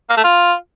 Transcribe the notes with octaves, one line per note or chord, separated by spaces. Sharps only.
A#3
A3
F4